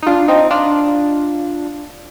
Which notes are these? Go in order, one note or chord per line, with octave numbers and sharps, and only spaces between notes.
D#4
D4 F4
C4 D#4
D4 F4